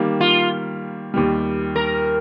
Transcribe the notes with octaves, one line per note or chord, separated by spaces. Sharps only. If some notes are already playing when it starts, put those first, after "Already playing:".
Already playing: D#3 G3 A#3
F4
D#2 D#3 G3
A#4